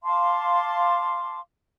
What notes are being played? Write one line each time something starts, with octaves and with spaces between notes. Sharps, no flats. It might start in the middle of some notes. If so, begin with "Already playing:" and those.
F5 A5 C6 D6